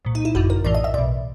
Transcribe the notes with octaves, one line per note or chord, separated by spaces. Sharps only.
C2 A#2
D#4
E4
G#1 F#2 D3 F#4
A#4
A#1 A2 E3 D5
D#5
E5
B1 B2 D5